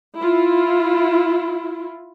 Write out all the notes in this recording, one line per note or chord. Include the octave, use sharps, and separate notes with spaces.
E4 F4